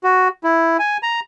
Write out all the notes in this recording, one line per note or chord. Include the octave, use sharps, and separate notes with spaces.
F#4
E4
G#5
A#5